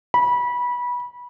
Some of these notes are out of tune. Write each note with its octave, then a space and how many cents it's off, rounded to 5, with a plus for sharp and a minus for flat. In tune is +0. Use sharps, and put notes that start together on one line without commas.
B5 -20